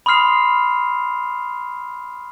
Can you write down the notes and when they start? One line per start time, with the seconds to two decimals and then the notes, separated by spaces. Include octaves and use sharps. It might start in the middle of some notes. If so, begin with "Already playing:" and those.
0.06 B5 C6 D#6 F6 C7 F7